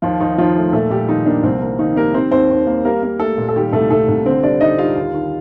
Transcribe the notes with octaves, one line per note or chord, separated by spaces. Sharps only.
D#2 F3 F4
D#2 D#3 D#4
D#2 F3 F4
A3
A#2 A3 A4
A#2 G3 G4
D#3 F3 D#4
A#3 D4
C2 C4
A#3
D#3 A#3 D#4
G3 A#3 A#4
D#3 C4 C5
D#2 C4 C5
D#2
A#3
G3 A#3 A#4
A#3
G3 A3 A4
A#2
A4
D#3 G3 G4
C2 A3 A4
C2 A3 A4
C2
D3 C4 C5
G3 D4 D5
D3 D#4 D#5
G3 F4 F5
D#2
D#3